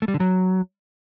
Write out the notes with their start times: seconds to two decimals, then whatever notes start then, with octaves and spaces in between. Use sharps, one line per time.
0.02 A3
0.08 G3
0.14 D3
0.20 F#3